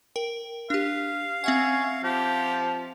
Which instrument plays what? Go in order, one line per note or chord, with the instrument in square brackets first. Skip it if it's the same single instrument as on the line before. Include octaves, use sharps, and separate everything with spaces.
[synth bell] A#4 G5
[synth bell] D4 G4 [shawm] F5
[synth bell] C4 E5 F#5 [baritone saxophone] C#4
[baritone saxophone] F3 [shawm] G4